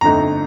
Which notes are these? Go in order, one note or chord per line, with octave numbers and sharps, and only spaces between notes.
G1 F2 D3 A3 D#4 A#5